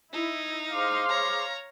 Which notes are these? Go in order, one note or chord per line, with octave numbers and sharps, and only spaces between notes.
D#4 E4
G#4 C5 F5 C6 D6
C#5 A#5